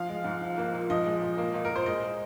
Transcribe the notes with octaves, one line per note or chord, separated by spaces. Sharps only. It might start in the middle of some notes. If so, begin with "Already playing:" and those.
Already playing: F3 F5
G#3
G#2
F3
A#3
A#2
F3 D#5
G#3
A#2
A#3
A#2
A#4
A#2 C5
G#3 D#5